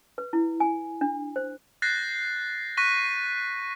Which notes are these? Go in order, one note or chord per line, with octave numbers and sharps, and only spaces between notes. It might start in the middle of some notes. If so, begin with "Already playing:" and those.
B4
E4
G#5
D4
C5
F#6 G6 A6 A#6 C7
C#6 F#6 A#6 B6 D#7